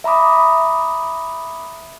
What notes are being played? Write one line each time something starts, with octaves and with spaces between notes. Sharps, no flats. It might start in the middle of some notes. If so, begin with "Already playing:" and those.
E5 A#5 B5 D6 D#6